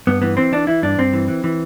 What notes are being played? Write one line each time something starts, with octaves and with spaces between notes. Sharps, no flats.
G2 B3
E3 B3
E3 C4
E3 D4
E3 E4
G2 D4
G2 C4
E3
E3
E3